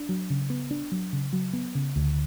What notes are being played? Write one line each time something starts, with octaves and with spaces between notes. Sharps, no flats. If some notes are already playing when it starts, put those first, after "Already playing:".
Already playing: D4
F#3
C#3
B3
D4
F#3
C#3
F#3
B3
C#3
D2